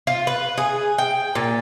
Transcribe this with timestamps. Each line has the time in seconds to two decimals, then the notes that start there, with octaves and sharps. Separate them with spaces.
0.07 F4
0.27 B4
0.58 G#4
0.98 G5
1.35 A#2